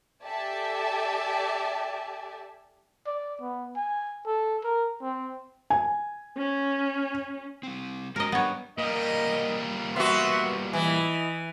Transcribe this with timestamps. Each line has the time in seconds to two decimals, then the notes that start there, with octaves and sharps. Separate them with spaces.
0.24 G4 A4 D5 E5 G#5 A5
3.07 D5
3.42 B3
3.77 G#5
4.27 A4
4.64 A#4
5.02 C4
5.70 G#5
6.37 C#4
7.63 G3 C4
8.16 G#3 F#4 A#4 D#5
8.32 G3 B3 D4 C#5
8.78 A#2 G3 A#4 D#5
9.96 B3 F#4 E5 F#5 C6
10.73 E3 E4 D#5 G#5